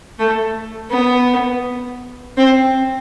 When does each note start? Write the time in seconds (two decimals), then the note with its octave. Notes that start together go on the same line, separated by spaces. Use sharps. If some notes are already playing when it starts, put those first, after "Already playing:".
0.19 A3
0.91 B3
2.37 C4